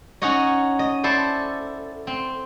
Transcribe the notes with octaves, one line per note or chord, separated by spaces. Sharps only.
C#4 D#4 F#4 C#5 D#5
D#5
E4 A4 C5 D5
C4